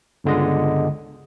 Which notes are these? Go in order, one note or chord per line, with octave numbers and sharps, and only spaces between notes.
G1 C#2 D3 G#3 D#5